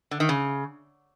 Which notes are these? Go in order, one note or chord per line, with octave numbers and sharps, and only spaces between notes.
D3
D#3
C#3